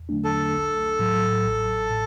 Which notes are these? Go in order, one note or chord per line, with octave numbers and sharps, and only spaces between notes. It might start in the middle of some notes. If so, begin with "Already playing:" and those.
Already playing: E2
D3 F#3 A3 D4
A4
B1
A2 F#3
A1
A2